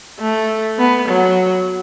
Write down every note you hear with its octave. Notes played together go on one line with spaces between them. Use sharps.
A3
B3
F#3